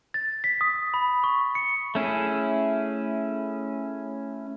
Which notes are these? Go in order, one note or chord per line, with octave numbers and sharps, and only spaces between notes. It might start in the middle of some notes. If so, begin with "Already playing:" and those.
A6
B6
D#6
B5
C#6
C#7
A3 C#4 E4 G#4